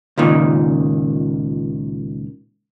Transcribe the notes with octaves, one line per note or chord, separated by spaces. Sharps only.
C#2 A#2 D#3